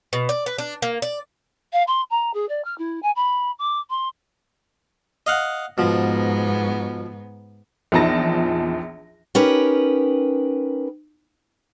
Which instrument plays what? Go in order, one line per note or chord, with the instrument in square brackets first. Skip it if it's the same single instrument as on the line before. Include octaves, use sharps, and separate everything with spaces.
[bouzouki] B2
D5
B4
D4
A#3
D5
[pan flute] F5
C6
A#5
G#4
D5
F6
E4
G#5
B5
D6
C6
[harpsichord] D#5 F5 F#5
[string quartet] G#2 B3 [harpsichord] B2 F3
[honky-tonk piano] A#1 E2 F3 D#4 A5 A#6
[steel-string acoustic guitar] C#4 D#4 G4 A#4 B4